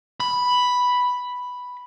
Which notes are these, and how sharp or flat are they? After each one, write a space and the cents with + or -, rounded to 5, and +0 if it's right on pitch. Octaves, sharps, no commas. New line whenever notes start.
B5 +0